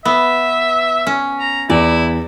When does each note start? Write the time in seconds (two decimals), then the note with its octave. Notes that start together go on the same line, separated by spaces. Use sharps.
0.05 B3 E5
1.07 C#4
1.39 A#5
1.70 E2 E4 D5